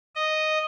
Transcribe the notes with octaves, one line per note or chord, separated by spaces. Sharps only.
D#5